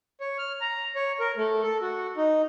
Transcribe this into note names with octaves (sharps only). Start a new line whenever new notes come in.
C#5
F6
A#5
C#5
A#4
A3
A4
F#4
D#4